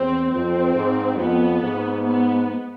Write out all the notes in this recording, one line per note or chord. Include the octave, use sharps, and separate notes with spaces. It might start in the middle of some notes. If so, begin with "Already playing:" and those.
Already playing: E2 C4
F2 C4
G#2
F2 B3
G#2
B3